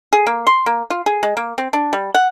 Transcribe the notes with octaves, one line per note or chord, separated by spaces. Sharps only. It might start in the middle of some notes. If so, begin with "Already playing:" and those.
G#4
A#3
C6
A#3
F4
G#4
G#3
A#3
C4
D4
G3
F#5